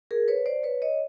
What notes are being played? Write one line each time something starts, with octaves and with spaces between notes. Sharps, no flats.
G#4 A#4
B4 C#5
C5 D5
B4 C#5
C#5 D#5